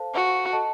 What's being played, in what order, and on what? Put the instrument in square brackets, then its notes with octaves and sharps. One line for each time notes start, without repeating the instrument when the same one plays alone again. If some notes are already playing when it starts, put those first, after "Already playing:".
Already playing: [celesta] A4 C5 F5 A5
[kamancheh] F#4
[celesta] A4 D#5 A5